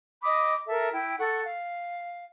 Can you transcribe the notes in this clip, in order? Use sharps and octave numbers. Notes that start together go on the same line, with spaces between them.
D#5 B5 D6 D#6
A4 A#4 E5
E4 G5
A4 F#5 C#6
F5